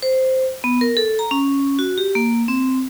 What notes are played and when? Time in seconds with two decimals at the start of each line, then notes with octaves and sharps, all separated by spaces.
0.03 C5
0.64 B3
0.81 A#4
0.97 A4
1.19 A#5
1.31 C#4
1.79 F#4
1.98 G4
2.15 A#3
2.48 C4